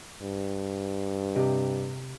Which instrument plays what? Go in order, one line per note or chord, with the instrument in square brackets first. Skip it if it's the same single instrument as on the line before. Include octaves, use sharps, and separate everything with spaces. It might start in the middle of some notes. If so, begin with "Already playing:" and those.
[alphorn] G2
[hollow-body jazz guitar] C3 G4 D#5